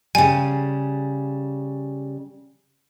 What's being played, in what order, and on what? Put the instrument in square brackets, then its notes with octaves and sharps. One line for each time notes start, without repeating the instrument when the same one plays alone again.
[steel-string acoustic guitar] C#3 G3 [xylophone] G#5